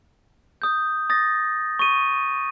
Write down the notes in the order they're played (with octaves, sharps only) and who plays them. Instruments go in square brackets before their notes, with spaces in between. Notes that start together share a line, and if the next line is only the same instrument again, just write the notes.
[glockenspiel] D#6 G6
D#6 A6 A#6
C#6 D#7